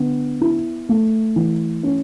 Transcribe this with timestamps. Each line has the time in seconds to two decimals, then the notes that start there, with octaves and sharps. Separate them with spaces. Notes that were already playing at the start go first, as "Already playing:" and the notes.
Already playing: D3 B3
0.41 E4
0.89 A3
1.36 E3
1.83 C#4